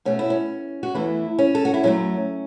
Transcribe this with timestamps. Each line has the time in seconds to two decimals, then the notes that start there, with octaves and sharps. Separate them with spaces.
0.05 B2 A3 C#4
0.19 E4
0.30 C#4
0.83 F#4
0.94 E2 E3 A3 E4
1.39 C#4
1.55 A4
1.65 F#4
1.74 E4
1.83 F#2 F#3 A3 C#4